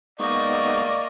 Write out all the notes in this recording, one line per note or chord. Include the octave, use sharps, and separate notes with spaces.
G#3 A#3 B3 D#4 D5 D#5 C#6